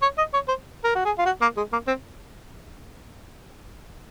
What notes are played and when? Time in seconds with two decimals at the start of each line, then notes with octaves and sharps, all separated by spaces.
0.02 C#5
0.18 D#5
0.34 C#5
0.49 C5
0.85 A#4
0.96 F#4
1.05 G#4
1.19 F4
1.26 F#4
1.42 A#3
1.57 G#3
1.73 A#3
1.88 C4